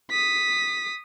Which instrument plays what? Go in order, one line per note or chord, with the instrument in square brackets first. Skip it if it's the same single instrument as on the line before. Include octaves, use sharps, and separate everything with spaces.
[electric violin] D#6 B6